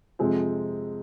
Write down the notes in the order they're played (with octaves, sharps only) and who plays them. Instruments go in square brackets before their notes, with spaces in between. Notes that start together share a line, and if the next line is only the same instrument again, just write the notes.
[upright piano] F2 C3 F3 G#3 C4